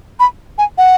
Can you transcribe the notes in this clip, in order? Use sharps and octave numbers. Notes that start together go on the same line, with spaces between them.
B5
G#5
F#5